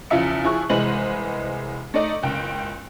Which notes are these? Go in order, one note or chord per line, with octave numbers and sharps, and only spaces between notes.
E2 C#3 F3 F4 E5 C#7
F3 E4 G#4 C#6 F#6
C2 E3 G#3 B4 C5 F#7
A3 D#4 D5 D#5
F#1 C#2 G5